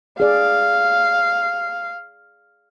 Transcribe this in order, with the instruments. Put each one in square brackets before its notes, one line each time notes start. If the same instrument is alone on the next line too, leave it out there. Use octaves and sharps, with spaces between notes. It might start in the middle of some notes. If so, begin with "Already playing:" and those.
[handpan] G#4 D5 [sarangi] F5